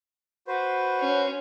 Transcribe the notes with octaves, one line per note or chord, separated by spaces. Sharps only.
F#4 B4 C5
C#4